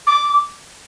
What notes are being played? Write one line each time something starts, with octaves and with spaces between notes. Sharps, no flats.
D6